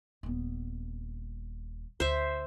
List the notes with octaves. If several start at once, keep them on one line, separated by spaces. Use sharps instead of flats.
D#1 B3
D2 C5 E5